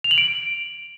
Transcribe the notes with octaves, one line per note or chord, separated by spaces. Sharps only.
F7
F#7
D7